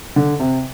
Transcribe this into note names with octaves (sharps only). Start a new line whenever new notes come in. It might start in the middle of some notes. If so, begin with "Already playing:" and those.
D3
C3